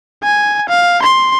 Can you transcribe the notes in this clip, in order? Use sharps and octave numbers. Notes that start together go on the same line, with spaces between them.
G#5
F5
C6